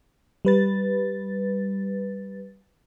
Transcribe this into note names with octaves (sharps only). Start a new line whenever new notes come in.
G3 B4 A6